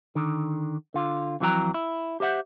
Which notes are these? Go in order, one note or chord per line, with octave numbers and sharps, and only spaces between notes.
D3 D#3
D3 F4
F2 E3 F#3 F4 G5 A#5
E4
G4 C5 E5 F#5